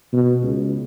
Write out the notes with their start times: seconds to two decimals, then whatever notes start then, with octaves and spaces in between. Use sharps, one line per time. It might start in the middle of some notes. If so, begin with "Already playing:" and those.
0.13 B2
0.43 C#2